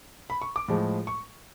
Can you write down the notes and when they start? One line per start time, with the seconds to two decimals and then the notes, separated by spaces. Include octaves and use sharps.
0.30 B5
0.42 C#6
0.56 D6
0.68 A2 F3 G#3
1.07 C#6